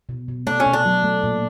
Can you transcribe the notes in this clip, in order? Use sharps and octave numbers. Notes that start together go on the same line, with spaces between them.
B2
B2
A3 D4
C#4
B2
D4
F#3
A3
A#2